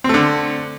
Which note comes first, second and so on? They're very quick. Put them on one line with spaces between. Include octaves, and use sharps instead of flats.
C4 A3 D3